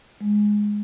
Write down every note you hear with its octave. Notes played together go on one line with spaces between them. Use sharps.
G#3